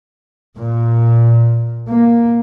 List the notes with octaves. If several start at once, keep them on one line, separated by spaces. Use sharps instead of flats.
A#2
A#3